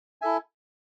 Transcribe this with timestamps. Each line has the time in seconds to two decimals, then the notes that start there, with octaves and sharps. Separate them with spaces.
0.22 E4 A4 E5 G#5